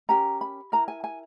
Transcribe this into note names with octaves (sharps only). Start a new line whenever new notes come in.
C#4 G4 A#4 A#5
B5
E4 A#4 A#5
G#5
G#5